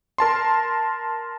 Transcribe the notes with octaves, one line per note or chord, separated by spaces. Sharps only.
A#4 A5 C6